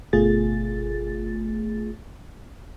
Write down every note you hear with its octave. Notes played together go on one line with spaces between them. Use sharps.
G1 B2 A3 F4 G#4 A6